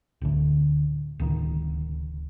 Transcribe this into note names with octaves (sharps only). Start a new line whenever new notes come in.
D1 D2
D1 C#2 D#3